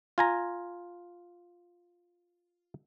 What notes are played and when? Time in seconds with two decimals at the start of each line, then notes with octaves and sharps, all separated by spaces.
0.18 F4 G#5 A#5